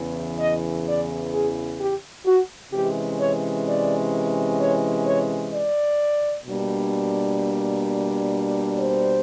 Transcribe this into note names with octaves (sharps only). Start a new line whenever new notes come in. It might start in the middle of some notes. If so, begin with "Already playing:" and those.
Already playing: E2 C#3 E3
D#5
D5
G#4
G4
F#4
C3 E3 G#3 C#4 G4
C#5
D5
C#5
C#5
D5
B2 G3 A#3 D4
C5